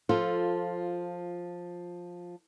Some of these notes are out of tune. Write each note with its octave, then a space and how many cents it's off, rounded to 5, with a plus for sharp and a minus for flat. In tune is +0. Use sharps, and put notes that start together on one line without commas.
F3 +10 F4 +0 A4 +0